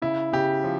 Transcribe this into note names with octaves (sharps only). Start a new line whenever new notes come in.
C#3 E4
C#3 G4
F3